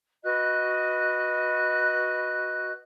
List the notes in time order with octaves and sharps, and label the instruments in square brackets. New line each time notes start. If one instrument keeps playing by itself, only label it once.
[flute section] F#4 B4 D#5 F#6